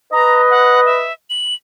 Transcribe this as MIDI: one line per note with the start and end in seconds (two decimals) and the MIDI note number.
0.13 1.10 71
0.13 1.07 75
0.13 0.42 82
0.50 0.80 78
0.86 1.12 76
1.30 1.54 102